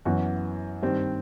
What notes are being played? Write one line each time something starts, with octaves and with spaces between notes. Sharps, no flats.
F#2 E3 B3 F#4
G2 D#3 G3 C4